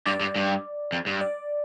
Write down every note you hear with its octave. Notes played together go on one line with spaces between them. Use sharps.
G2 D5
G2
G2
F2
G2
D5